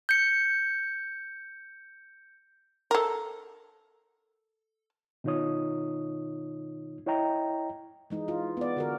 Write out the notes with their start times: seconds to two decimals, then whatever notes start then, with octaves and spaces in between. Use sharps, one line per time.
0.09 G6 C#7
2.91 A4 A#4
5.24 B2 D#3 D#4 F4 C#5 D#6
7.06 E4 C#5 D#5 G5 A#5
8.10 E3 G#3 D#4
8.28 F4
8.57 B3 D5
8.77 D3 F#4 A#4